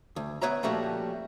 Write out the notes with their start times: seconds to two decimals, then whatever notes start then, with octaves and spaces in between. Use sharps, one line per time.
0.16 D2
0.42 B3 B4 C#5 E5 A#5
0.63 A#2 F3 G3 A3 C#4 F#4